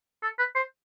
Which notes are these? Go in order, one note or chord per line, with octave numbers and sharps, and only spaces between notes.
A4
B4
C5